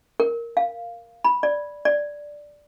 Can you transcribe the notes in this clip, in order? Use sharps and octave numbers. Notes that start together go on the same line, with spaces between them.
A#4
F5
B5
D5
D5